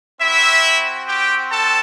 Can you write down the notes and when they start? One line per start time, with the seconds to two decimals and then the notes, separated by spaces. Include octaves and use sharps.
0.21 C4 E4 F#4 E5
1.08 G4 G5
1.52 A4 A5